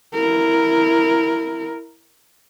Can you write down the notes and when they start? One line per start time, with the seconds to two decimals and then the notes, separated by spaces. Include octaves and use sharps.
0.14 E4 A#4